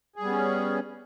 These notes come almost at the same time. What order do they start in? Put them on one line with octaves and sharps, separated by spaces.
G#4 G3 B3 C#4